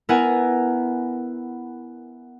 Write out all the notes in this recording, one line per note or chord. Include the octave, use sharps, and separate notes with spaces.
B3 E4 A#4 F#5 G#5 A#5